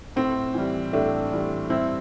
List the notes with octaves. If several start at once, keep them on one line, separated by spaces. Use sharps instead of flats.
A2 C4
E3 G3
A2 A3 D4
E3 G3
G2 C4 E4